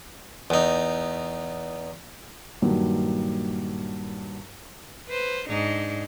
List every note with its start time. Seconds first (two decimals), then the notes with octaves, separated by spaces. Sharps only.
0.50 E2 D#4
2.62 G2 A#2 D#3 F#3
5.08 B4 C5
5.49 G#2 D4 D#4